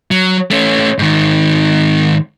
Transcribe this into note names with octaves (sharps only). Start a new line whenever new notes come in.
F#3
A3 C#4
G#2 D#3